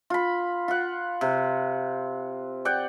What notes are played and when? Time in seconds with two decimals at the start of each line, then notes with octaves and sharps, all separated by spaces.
0.10 F4 B5
0.68 F4 F#5
1.21 C3
2.65 D5 F#5 G5